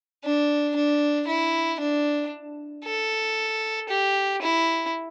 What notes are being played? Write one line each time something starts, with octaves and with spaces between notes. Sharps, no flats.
D4
D4
E4
D4
A4
G4
E4